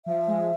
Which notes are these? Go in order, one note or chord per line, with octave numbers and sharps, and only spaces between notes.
F3 E5
G#3